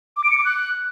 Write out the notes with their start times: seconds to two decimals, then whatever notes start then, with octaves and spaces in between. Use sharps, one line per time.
0.17 D6
0.24 D7
0.31 C#7
0.38 D6
0.45 F#6